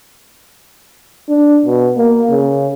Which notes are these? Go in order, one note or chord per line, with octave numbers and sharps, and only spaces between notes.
D4
B2
A#3
C#3